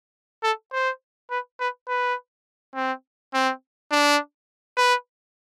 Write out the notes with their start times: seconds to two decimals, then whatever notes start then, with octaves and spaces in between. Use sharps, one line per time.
0.43 A4
0.72 C5
1.30 B4
1.60 B4
1.88 B4
2.75 C4
3.34 C4
3.91 D4
4.77 B4